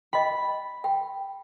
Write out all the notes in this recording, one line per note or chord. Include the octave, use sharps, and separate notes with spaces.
D#5 G5 B5
G5